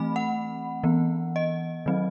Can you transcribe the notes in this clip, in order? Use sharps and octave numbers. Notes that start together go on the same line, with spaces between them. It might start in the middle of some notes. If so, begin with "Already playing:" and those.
Already playing: E3 A3 C4 B5
F#5
E3 B3
D#5
D#3 F#3 C4